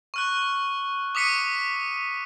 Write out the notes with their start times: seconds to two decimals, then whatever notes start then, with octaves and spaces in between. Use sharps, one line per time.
0.14 C#6 F6 F#6
1.15 D6 D#6 B6 C#7 D#7